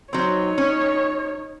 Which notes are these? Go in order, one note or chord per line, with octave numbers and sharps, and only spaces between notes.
F#3 C4 D#4 C#5
C#4